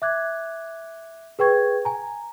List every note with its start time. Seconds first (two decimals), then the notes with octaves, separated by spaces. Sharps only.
0.02 E5 D6 F#6 G#6
1.39 G#4 B4 G5 C#6 G#6
1.85 G#5 A#5